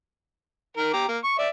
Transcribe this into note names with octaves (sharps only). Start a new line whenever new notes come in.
D#3 A#4
G4 A#5 D6
A#3
C#6
D5 E5